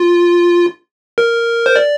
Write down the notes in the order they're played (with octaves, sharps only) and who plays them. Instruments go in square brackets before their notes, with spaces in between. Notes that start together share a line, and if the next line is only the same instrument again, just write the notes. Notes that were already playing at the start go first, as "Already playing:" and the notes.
Already playing: [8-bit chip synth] F4
A#4
C5
D5